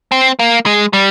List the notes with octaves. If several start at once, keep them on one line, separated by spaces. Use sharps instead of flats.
C4
A#3
G#3
G3